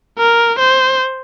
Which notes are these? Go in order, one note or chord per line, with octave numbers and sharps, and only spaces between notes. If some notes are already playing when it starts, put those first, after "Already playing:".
A#4
C5